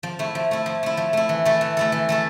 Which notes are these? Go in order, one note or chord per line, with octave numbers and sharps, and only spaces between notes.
F3
A3 E4
F3
A3 E4
F3
A3 E4
F3
A3 E4
E3
A3 E4 A4
E3
A3 E4 A4
E3
A3 E4 A4